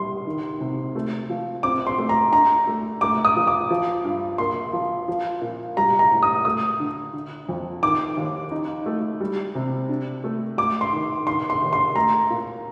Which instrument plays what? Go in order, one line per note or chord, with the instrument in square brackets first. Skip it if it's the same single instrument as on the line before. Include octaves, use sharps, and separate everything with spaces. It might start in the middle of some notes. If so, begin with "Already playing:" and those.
Already playing: [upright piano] G3 [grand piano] C6
[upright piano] D#3
C3
A3
F3
[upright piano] C4 [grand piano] D6
[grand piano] C6
[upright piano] A3
[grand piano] A#5
[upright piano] D4 [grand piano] A#5
[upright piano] A3
[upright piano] A3 [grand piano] D6
[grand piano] D#6
[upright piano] F3
[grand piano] D6
[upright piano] F3
G2
[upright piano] A#3 [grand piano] C6
[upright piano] F3
F3
A#2
[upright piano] G3 [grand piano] A#5
[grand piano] A#5
[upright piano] A2
[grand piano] D#6
[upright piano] A3 [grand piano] D#6
[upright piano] D3
D3
F2
[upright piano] D#3 [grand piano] D6
[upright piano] D#2
D#4
A3
G3
C3
D4
A3
[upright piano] A3 [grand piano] D6
[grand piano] C6
[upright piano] D#3
[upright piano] D#3 [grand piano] C6
[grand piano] C6
[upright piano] D#2
[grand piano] C6
[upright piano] A3 [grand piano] A#5
[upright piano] A#2